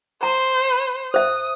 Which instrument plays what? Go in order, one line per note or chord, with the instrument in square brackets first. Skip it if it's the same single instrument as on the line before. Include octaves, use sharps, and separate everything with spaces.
[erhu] C5 [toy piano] A#5
[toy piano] C5 E5 [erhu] D#6